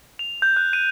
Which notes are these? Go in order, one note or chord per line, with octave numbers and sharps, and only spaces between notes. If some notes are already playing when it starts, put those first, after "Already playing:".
F7
G6
F#6
D#7